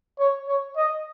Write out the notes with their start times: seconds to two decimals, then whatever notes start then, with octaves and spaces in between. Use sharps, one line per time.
0.19 C#5
0.48 C#5
0.77 D#5